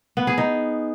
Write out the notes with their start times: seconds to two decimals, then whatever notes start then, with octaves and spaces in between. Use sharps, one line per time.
0.17 B3
0.27 G#4
0.38 D#4